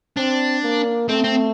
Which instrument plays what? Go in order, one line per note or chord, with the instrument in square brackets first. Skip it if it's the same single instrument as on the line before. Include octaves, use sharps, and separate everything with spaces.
[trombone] C4 [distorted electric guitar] D4
[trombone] A#3
[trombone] A3 [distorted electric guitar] C4
[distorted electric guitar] C4